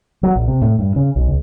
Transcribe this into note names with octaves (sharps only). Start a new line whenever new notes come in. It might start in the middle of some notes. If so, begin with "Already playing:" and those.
F#3
A#1
C3
A2
G2
C#3
B1
C#2